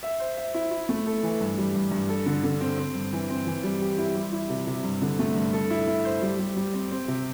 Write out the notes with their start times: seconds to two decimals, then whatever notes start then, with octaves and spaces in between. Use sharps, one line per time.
0.03 E5
0.20 C5
0.37 E5
0.55 E4
0.71 E4
0.89 A3
1.06 A4
1.23 E3
1.41 G2
1.58 G3
1.75 G2
1.92 G2
2.09 A4
2.26 D3
2.44 D3
2.61 C4
2.78 C4
2.95 G2
3.13 E3
3.30 C4
3.47 E3
3.63 G3
3.81 G4
3.98 E4
4.15 G3
4.33 E4
4.50 C3
4.67 C3
4.84 G2
5.02 D3
5.19 A3
5.36 G2
5.53 A4
5.70 E4
5.87 E4
6.05 C5
6.22 G3
6.39 G3
6.56 G3
6.73 C4
6.91 C4
7.08 C3